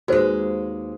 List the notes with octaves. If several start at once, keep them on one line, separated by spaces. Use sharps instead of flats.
D#2 G#3 F#4 B4 C5